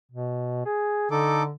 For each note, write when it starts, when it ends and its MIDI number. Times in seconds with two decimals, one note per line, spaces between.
0.11 0.62 47
0.65 1.10 68
1.11 1.52 50
1.11 1.43 63
1.11 1.43 69
1.11 1.43 86